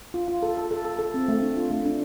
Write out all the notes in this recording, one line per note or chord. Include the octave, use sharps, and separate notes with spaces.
F4
F4
A4
A4
A4
A4
A4
C4
A3
D4
F4
A3
D4